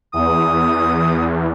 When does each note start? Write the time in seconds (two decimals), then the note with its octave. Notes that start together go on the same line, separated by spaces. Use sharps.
0.13 E2 D#6